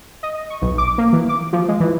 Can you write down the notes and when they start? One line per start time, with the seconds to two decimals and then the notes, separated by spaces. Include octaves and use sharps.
0.23 D#5
0.50 C#6
0.62 B1
0.78 D6
0.98 A#3
1.13 E3
1.29 D6
1.53 F3
1.68 G#3
1.80 E3